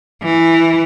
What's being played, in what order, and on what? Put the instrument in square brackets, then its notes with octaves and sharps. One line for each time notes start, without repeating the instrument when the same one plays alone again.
[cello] E3